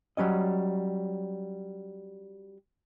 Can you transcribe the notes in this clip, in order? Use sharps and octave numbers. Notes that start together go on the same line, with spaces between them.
F#3 G3 C#4 D#5